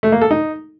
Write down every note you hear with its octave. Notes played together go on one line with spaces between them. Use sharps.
A3
A#3
A4
D#4